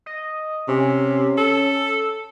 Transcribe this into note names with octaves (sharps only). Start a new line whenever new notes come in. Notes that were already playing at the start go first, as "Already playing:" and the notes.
D#5
C3 C#4
A4